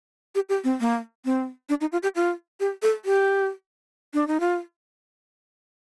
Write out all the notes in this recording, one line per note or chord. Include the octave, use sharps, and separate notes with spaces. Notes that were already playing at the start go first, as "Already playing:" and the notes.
G4
G4
C4
A#3
C4
D4
D#4
F4
G4
F4
G4
A4
G4
D4
D#4
F4